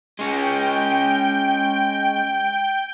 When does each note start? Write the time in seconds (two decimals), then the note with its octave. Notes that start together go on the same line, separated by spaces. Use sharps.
0.19 G#3 C#4 G5